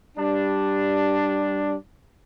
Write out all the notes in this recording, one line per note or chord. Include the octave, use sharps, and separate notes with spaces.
G3 D4